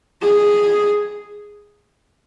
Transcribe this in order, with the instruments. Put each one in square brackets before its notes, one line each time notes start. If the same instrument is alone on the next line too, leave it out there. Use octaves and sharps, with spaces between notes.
[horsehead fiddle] G#4